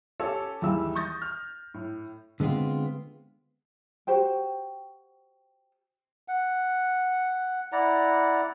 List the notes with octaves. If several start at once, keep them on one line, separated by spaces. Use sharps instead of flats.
C#4 G4 A4 C#5
D#2 E3 G3 G#3 E4 E6
C#6 D#6 G6 A6 A#6
F6
A2
D3 G#3 B3 C4 F4
F#4 G4 C5 G5
F#5
E4 D5 F#5 A#5